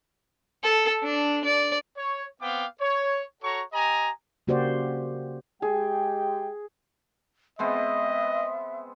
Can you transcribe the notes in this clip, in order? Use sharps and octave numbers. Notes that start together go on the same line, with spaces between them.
A4
D4
D5
C#5
B3 C4 F5 G5 D6
C#5
F#4 A4 C#5 A#5 C#6
G4 D#5 G#5 A#5
C#3 A#3 F#4 G4 C5 D5
G#3 G4 G#4 G5
G#3 B3 C4 D#5 E5